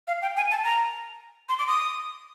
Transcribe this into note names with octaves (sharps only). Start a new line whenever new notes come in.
F5
G5
G#5
A5
A#5
C6
D6
D#6